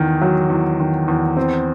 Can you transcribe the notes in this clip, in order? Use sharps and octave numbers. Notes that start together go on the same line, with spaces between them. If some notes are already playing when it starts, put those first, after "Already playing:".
Already playing: E2 D#3
F#3
E2
D#3
E2
C4